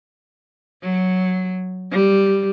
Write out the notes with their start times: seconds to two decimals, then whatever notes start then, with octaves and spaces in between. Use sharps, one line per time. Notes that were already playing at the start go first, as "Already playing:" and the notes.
0.82 F#3
1.91 G3